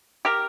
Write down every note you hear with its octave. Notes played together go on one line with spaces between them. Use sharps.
G4 A#4